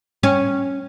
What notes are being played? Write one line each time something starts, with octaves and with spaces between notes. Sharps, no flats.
C#4